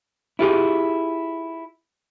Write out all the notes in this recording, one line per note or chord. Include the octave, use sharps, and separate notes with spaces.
E4 F4 G4 G#4